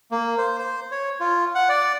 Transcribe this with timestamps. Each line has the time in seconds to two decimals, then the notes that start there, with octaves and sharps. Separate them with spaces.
0.11 A#3
0.38 C5
0.59 C5
0.91 C#5
1.20 F4
1.55 F#5
1.69 D5